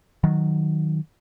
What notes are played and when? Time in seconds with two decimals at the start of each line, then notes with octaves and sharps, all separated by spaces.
0.24 D#3 F#3